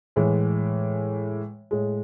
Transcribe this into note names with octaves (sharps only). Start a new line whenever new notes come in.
A2 E3 G#3
A2 G#3